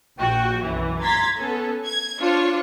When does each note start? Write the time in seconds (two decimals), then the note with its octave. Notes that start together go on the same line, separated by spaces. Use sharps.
0.18 A#1 F#4 G5
0.62 B1 F#2 E3
1.03 A#5 C6 G#6 A6 B6
1.37 B3 C#4 A4
1.86 G#6
2.20 D4 F4 C5 C#5